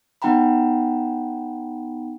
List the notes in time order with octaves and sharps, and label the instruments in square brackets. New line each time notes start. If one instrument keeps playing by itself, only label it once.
[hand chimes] B3 D#4 F#5 G5 A#5 B5